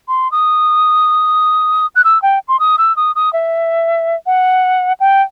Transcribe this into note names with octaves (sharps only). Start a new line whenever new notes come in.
C6
D#6
F#6
E6
G5
C6
D#6
E6
D#6
D#6
E5
F#5
G5